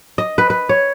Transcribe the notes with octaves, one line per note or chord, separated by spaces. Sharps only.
D#5
B4
B4
C#5